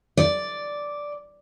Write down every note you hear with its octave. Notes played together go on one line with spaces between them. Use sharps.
D5